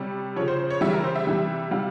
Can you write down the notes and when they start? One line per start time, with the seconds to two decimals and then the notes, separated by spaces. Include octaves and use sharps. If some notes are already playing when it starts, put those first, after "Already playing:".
Already playing: C3 G3 C#5
0.36 C#3 F3 C#5
0.48 C5
0.59 C5
0.71 C#5
0.81 C#3 E3 G3 E5
0.93 A#4
1.04 C5
1.16 E5
1.27 C3 E3 G3
1.71 C3 G3 F5